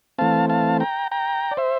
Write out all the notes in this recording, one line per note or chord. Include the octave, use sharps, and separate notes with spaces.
E3 A3 C4 F5 A5
F5 A5
G5 A#5
G5 A#5
D5
C5 E5